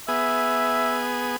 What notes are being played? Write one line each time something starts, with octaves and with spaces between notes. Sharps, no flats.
B3 G#4 E5